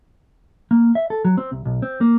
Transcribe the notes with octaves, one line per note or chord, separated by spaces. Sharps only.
A#3
E5
A4
F#3
C4
C2
B1
C4
A#3